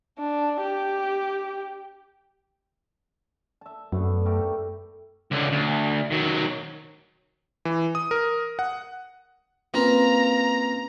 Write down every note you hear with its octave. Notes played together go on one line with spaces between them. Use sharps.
D4
G4
E5 A5
F#2 D3 A3 B3
A3 G4 A#4
C#2 D3
D2
D#3 F#3
E3
D#6
A#4
F#5
A#3 C4 C#4 F4 B4 A#5